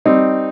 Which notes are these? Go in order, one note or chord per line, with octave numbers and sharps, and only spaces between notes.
G3 C4 D#4